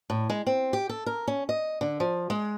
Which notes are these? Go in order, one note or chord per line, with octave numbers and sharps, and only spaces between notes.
A2
G#3
C4
G4
A4
A#4
C#4
D#5
D3
F3
G#3